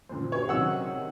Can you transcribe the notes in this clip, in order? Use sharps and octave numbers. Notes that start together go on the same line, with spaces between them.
F#2 A#2 D3 C5
G4 G#4 C#5
C3 D#3 F#3 C4 C#4 F#5 E6